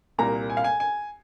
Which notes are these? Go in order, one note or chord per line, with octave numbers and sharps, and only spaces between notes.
C2 A#2 A#3 A#5
G#5
F5
G#5
G#5